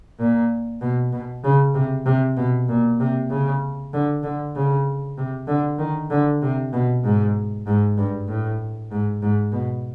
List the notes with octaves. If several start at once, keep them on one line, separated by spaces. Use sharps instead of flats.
A#2
B2
B2
C#3
C3
C3
B2
A#2
C3
C#3
D3
D3
C#3
C3
D3
D#3
D3
C3
B2
G#2
G#2
G2
A2
G#2
G#2
B2